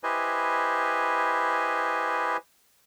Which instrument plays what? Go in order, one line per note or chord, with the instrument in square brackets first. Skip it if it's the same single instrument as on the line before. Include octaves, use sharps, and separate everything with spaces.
[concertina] E4 G4 B4 C5 D#5 G#5